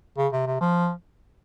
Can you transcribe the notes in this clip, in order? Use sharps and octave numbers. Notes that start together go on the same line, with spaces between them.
C#3
C3
C3
F3